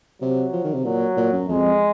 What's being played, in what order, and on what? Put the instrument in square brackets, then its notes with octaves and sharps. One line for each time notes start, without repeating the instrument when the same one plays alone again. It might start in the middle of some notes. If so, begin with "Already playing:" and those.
[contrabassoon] C3 [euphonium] F#3
[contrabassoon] F3
D#3
C3
[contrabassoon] A#2 [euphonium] F#3
[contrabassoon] A#2
F#2
[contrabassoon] F2 [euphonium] G#3